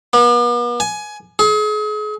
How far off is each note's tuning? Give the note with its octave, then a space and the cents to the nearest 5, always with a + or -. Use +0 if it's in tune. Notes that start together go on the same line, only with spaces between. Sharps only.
B3 -45
G#5 +20
G#4 +35